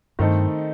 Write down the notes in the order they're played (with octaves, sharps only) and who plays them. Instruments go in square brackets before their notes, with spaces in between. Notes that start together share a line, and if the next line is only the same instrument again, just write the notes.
[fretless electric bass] G2 [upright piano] D#3 A3 C4 D#4 A4